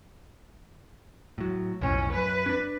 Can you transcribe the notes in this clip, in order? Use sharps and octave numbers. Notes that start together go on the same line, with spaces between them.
A2 F#3
B1 F2 A2 C#4
F#2 B4
C#4 D4